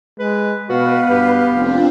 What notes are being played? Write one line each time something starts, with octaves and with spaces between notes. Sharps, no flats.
G#3 B4
B2 B3 F#4 B4 F5
G2 G4
F1 C4 D4 F4